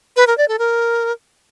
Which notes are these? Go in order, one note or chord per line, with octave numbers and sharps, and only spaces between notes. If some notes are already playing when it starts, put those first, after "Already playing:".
B4
A#4
D5
A4
A#4